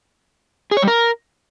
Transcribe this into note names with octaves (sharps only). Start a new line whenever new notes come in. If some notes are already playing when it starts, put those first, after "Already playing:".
G#4
C#5
G3
A#4